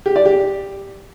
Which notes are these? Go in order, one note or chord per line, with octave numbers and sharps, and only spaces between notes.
G4
D5
G4